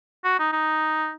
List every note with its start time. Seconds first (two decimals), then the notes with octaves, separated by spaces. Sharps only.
0.25 F#4
0.40 D#4
0.53 D#4